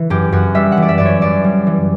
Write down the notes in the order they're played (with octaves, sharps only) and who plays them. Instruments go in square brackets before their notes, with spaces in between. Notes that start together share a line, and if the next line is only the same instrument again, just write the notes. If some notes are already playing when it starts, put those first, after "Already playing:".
Already playing: [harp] E3
F#2 G4
F#2 F#4
G3 E5
F#5
E3
D5
E5
F#2 D5
C#5
F#2 D5
G3
E3